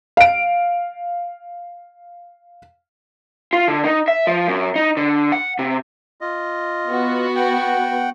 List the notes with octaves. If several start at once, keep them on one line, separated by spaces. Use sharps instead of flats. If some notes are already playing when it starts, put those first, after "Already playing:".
F5 D7
F4
D3
D#4
E5
F3
F#2
D#4
D3
F#5
C3
F4 D#5
B3 F#4
F#5 G5